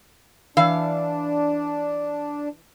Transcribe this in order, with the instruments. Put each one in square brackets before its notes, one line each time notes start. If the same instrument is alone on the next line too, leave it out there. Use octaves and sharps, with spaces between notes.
[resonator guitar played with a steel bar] E3 F5 [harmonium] D4